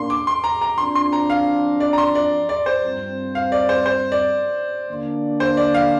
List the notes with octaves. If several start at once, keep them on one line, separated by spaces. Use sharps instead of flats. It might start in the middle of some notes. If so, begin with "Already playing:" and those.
Already playing: A#2 A#3 D4 C6
D6
C6
A#5
A#5
F2 F3 D4 C6
C6
A#5
F5
D5
A#5
C6
D5
D5
C5
G2 F3 C4
F5
D5
C5
C5
D5
D3 A#3 D4
C5
D5
F5